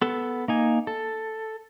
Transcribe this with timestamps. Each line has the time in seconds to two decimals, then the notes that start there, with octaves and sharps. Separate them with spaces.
0.02 B3 A4
0.48 A#3 D#4 G#5
0.87 A4